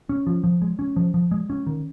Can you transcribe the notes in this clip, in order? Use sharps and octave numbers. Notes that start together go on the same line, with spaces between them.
C#4
F3
F3
G#3
C#4
F3
F3
G#3
C#4
D#3